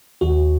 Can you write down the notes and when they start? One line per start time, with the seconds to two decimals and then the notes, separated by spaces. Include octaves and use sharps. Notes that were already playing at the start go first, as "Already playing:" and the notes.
0.21 D#2 F#4